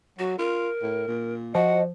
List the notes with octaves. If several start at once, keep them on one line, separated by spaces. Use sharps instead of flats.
F#3 F#4
F4 A#4
A2
A#2
F3 F#4 D#5 F#5